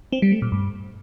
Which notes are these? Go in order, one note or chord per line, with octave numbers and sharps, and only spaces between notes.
C4
G3
A3
A#2
G2